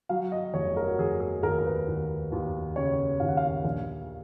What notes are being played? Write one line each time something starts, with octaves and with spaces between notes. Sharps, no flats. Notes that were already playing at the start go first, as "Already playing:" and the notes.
F#3 F5
D#5
F1 C#5
A#4
F#4
F1 G#4
G#4
D#2 A#4
A#4
B4
D#2
D#2
C#3 C#5
D#2 F5
F#5
F5
A#1